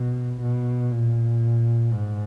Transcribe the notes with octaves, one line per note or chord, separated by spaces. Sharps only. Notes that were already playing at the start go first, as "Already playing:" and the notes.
Already playing: B2
B2
A#2
G#2